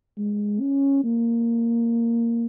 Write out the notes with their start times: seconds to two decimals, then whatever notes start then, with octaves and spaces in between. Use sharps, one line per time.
0.17 G#3
0.61 C#4
1.04 A#3